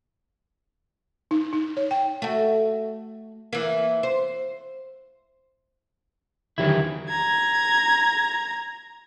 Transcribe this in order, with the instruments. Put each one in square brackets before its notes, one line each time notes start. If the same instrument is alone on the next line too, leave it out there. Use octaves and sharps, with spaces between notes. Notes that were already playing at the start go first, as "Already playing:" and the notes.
[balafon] D#4
D#4
C#5
G5
[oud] A3 F#4
E3 A#3
C5
[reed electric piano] E2 D3 G4 [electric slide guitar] D#3 F#3 E4
[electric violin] A#5 G#6